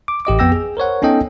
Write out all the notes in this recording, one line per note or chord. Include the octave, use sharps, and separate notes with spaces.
D6
A1 G4 D#5 D6
F2 B3 G5 E6 A#6
G#4
A#4 C5 C#5 F#5
B3 C#4 D#4 A4 D#5 G5